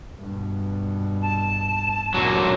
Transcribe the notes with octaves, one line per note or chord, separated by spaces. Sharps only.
G2 B2
A5
D2 A#2 F#3